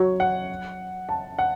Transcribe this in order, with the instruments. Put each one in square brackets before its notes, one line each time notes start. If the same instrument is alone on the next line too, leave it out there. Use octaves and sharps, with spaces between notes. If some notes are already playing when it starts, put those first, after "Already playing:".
Already playing: [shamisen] F#3 [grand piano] C#5
[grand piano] F#5
A5
F#5